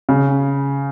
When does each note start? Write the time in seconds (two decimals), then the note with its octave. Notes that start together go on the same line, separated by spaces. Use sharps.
0.09 C#3